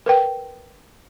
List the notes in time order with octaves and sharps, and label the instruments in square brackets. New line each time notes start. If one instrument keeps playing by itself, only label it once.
[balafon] A#4 B4 G5